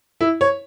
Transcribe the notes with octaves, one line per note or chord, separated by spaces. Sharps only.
E4
C#5